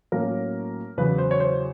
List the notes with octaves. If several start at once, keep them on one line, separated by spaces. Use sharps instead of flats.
A2 F#3 A#3 C#4 A#4
E2 C#3 F#3 B4
C5
C#5
C5